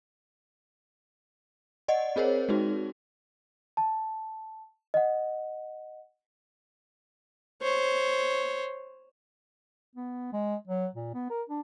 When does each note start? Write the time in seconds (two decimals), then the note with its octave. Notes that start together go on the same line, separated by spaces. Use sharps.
1.88 D5 D#5 F#5
2.16 C4 G#4 A#4 C5 C#5
2.49 G#3 D#4 F#4
3.77 A5
4.94 D#5 F#5
7.62 C5 C#5
9.95 B3
10.33 G#3
10.68 F#3
10.95 A#2
11.14 B3
11.30 A#4
11.49 D4